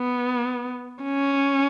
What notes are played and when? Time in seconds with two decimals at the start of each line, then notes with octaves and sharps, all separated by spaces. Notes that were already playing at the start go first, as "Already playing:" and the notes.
Already playing: B3
1.04 C#4